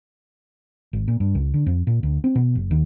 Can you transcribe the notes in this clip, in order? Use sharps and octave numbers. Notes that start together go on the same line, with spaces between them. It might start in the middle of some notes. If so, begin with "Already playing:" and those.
G#1
A#2
G2
C#2
D3
F2
A#2
D2
C4
B2
F#1
D#2